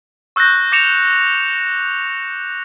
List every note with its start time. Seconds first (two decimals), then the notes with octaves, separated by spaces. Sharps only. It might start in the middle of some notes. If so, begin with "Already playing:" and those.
0.36 C#6 E6 F#6 G6 A#6
0.72 D6 A#6 C#7 E7 F7